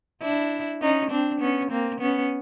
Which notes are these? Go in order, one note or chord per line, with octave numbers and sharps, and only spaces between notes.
D4 E4
C#4 D#4
C4 D4
B3 C#4
A#3 C4
B3 C#4